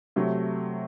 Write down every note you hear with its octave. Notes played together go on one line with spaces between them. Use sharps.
C3 F#3 A3